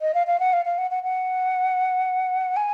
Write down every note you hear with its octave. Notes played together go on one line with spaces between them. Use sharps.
D#5
F5
F5
F#5
F5
F5
F#5
F#5
F#5
G#5